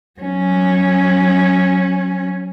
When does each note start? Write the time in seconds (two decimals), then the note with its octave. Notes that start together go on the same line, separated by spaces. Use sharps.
0.20 F#3 C#4